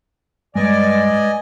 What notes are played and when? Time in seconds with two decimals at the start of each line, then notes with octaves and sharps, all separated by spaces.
0.56 G2 G#3 B4 D5 D#5 G#5